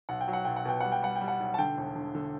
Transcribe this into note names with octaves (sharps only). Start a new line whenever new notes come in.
B1 F#5
G5
F#3
F#5
B1 G5
F#5
B2 G5
G3 F#5
G5
G3 F#5
G5
G3
F#5
B1
A5
D3 G5
E1
D3
D3